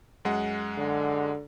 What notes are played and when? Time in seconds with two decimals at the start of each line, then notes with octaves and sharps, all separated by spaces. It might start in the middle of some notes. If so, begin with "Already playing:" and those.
0.25 F#2 G#3 F#5
0.77 D3